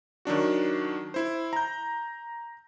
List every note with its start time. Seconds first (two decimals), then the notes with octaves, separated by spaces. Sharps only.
0.25 D#3 F#3 D4 F#4
1.14 E4 C5
1.53 A#5 G6